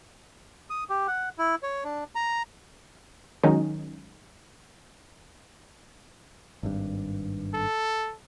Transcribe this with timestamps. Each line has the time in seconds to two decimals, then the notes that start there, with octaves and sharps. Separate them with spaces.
0.70 D#6
0.90 G4
1.07 F#5
1.38 E4
1.63 C#5
1.84 D4
2.15 A#5
3.43 D#3 F#3 G#3 C#4 D#4
6.63 G#1 G2
7.54 A4